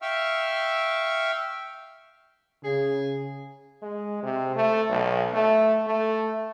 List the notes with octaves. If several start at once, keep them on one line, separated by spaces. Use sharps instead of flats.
E5 F5 G5 C#6 E6 F6
C#3 G#4
G#3
C3
A3
B1
A3
A3